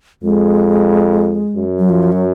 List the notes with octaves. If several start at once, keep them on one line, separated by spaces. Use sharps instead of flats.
F2 G#3
F#2
F#3
F3
F#3